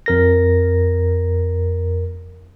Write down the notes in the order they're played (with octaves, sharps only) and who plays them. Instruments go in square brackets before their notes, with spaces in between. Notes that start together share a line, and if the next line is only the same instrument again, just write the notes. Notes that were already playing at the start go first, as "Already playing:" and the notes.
[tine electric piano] F2 A#4 A#6